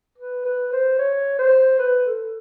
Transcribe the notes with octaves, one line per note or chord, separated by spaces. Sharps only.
B4
B4
C5
C#5
C5
B4
A4